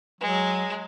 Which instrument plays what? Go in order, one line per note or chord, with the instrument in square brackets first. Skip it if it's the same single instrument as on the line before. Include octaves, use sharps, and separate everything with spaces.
[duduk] F#3 [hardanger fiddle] G#3